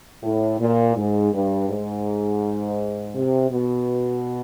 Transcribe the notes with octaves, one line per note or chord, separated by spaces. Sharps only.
A2
A#2
G#2
G2
G#2
C3
B2